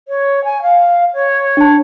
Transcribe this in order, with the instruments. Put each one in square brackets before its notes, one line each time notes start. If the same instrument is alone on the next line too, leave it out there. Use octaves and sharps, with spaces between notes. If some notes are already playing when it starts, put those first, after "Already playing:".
[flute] C#5
G#5
F5
C#5
[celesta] D4 A5